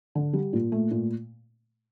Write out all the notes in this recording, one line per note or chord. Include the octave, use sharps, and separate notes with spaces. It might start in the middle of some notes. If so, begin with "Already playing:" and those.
D3
G3
A#2
A3
A#2